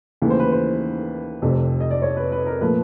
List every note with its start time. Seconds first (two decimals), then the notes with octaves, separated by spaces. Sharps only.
0.22 D#2 C#3 E3 A3 B4
0.30 C5
0.39 B4
0.52 C5
1.42 F1 F2 C3
1.80 D#5
1.91 D5
2.02 C#5
2.16 B4
2.32 B4
2.46 A#4
2.61 A#2 F3 A3 B4